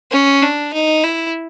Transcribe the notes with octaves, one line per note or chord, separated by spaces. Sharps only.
C#4
D4
D#4
E4